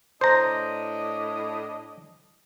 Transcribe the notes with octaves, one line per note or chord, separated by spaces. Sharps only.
A2 D4 C5 D#5 A#5